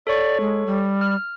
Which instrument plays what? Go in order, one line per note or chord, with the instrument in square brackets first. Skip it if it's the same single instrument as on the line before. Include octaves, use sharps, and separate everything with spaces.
[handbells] A4 C#5 C#6 [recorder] D5
[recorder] G#3
G3
[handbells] F6